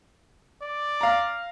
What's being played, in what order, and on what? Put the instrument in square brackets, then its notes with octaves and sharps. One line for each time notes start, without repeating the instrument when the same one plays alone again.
[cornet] D5
[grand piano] F5 A#5